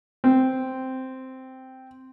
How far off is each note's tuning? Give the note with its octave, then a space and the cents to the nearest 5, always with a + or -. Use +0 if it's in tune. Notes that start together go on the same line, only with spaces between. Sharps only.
C4 -5